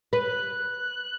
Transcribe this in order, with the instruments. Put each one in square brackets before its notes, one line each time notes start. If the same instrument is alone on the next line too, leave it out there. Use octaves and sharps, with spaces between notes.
[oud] B4 [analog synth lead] F#6